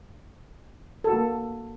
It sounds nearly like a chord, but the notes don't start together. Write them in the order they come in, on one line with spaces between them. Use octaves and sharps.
A4 F#4 A#3